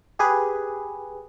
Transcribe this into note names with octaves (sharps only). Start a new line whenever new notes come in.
G4 G#4 B4